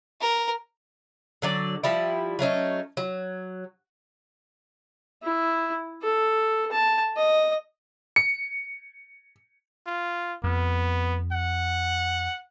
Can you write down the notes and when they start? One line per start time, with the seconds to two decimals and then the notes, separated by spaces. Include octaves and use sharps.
0.21 A#4
1.42 D3 F#3 D5
1.83 F3 G3 E4
2.39 F#3 A3 C#4 D#4
2.97 F#3
5.23 E4
6.02 A4
6.71 A5
7.17 D#5
8.16 C#7
9.87 F4
10.44 F2 B3
11.32 F#5